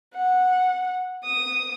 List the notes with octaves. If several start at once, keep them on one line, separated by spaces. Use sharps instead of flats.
F#5
D#6